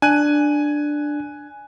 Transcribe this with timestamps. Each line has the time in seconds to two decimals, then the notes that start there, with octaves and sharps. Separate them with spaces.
0.02 D4 G#5 F#6 D#7